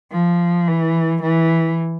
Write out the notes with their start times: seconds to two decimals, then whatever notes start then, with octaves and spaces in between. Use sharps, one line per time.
0.12 F3
0.68 E3
1.22 E3